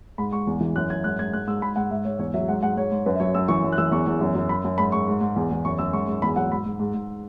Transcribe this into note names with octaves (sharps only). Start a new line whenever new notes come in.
G#2 B5
G#2 C#6
E2
E3
F#2 F#6
F#2 G#6
G#2 F#6
G#2 G#6
G#2 F#6
G#2 E6
G#2 B5
G#2 F#5
G#2 E5
G#2 C#5
E2 C#5
F#3 E5
G#2 F#5
G#2 F#5
G#2 C#5
G#2
F#2 B4
E5
F#3 C#5
F#2 E6
E3 C#6
F#2
F#6
E3 E6
E2 C#6
E2
F#2
F#2
F#2 B5
F#2
G#2 B5
G#2 C#6
G#2
G#2
E2
E2
F#2 C#6
F#2 E6
G#2 C#6
G#2
E2 B5
F#3 F#5
G#2 B5
G#2
G#2
G#2